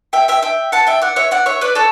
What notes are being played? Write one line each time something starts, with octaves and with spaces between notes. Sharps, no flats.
E5 G5
E5 G5
E5 G5
F#5 A5
E5 G5
D5 F#5
C#5 E5
D5 F#5
C#5 E5
B4 D5
A4 C#5